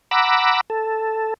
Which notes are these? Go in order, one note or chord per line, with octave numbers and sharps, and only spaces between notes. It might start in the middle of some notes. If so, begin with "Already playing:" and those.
F#5 A#5 B5 D6 E6
A4